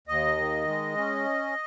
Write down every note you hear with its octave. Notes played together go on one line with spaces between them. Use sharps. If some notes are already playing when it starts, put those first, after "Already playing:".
D#2 D#5
D#3
G#3
C#4